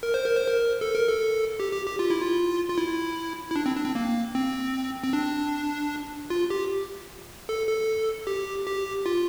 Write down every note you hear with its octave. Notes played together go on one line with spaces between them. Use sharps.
A#4
C5
A#4
C5
A#4
A4
A#4
A4
G4
G4
G4
F4
E4
F4
F4
E4
E4
D4
C4
D4
C4
A#3
C4
C4
D4
F4
G4
A4
A4
G4
G4
F4